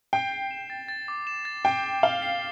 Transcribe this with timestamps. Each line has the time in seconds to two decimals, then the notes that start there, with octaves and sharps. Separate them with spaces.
0.13 G5 C7
0.32 C7
0.51 E7
0.70 A6
0.88 A6
1.08 D6
1.27 E7
1.45 A6
1.65 G5 C7
1.83 A6
2.03 F5 G7
2.22 C7